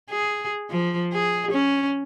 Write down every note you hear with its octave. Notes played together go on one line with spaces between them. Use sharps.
G#4
F3
G#4
C#4